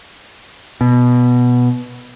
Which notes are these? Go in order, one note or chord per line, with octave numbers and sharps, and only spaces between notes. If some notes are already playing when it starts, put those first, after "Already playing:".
B2